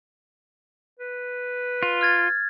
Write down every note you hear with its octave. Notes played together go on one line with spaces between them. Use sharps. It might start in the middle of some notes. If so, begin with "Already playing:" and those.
B4
F4
F6 G#6 A6